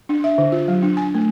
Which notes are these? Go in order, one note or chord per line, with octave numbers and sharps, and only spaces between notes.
D4
E5
D3
F4
F#3
D4
G#5
A3